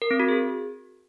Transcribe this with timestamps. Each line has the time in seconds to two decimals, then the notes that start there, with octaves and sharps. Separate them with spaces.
0.02 A#4
0.11 C4
0.20 F#4
0.29 G#4